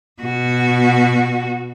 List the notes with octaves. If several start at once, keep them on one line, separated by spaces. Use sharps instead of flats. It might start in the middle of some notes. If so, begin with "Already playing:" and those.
B2 F#4